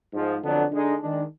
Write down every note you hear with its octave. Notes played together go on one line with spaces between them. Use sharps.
G#2 F3 G#3
F2 D3 F#3 B3 D4
D3 G#3 D#4
D#3 G#3 D4